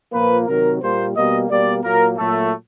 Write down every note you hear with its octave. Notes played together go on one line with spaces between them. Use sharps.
A#2 F3 A#3 B4
C3 D#3 F#3 A#4
A#2 G3 A#3 C5
B2 G3 A#3 D#5
B2 G3 A#3 D5
A#2 F#3 A#3 A#4
A#2 F#3 A3